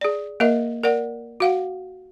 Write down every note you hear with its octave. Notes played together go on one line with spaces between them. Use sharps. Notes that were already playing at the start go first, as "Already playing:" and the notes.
G#4 D5
A#3 A#4 D#5 E5
A#4 D5 F#5
F#4 F5 F#5